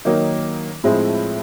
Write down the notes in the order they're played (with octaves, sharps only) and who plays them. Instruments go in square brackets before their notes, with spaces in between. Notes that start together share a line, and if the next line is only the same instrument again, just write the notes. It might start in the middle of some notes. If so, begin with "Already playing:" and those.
[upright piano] D#3 F#3 A#3 D#4
A2 F3 G#3 C4 E4